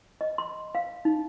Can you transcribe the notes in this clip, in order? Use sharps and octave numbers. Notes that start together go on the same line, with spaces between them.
D#5
C6
F5
D#4